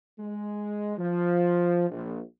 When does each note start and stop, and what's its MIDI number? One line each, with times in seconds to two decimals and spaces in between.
0.18 0.95 56
0.98 1.86 53
1.90 2.20 34